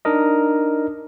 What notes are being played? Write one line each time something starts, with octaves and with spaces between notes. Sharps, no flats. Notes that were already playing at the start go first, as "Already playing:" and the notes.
D4 D#4 A#4 D#5